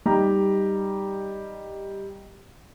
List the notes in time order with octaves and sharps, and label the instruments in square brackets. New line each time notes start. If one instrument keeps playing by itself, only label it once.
[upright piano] G3 D#4 G4 A#5